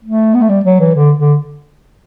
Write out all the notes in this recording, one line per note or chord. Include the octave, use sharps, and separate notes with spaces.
A3
B3
A3
G3
F#3
E3
D3
D3